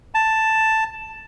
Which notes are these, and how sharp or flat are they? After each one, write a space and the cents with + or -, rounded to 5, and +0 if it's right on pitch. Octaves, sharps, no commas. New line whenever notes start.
A5 +5